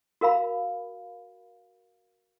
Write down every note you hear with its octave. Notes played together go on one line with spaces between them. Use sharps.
F#4 A#4 F5 B5